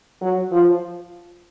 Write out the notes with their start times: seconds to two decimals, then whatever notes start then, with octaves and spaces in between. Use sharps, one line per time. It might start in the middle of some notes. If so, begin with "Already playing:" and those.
0.21 F#3
0.52 F3